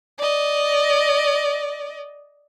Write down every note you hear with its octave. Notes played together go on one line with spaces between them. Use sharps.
D5 D#5